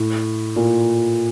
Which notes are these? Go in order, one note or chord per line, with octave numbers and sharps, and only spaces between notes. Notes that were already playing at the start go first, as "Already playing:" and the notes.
Already playing: A2
A#2